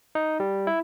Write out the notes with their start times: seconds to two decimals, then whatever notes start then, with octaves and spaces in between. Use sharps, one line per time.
0.15 D#4
0.40 G3
0.67 E4